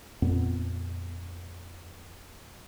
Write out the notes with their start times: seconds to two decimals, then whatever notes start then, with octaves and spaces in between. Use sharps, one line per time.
0.22 F2 A#2 B3